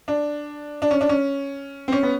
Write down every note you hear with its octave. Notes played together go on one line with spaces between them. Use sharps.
D4
D4
C#4
D4
C#4
C4
C#4
B3